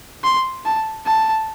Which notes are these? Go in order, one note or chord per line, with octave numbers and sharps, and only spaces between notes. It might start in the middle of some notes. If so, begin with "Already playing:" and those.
C6
A5
A5